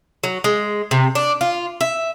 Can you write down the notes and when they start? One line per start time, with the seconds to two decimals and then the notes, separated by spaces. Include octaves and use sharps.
0.23 F#3
0.44 G#3
0.91 C3
1.15 D4
1.41 F4
1.81 E5